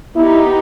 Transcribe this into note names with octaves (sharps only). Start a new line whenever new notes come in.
B3 D#4 E4 G4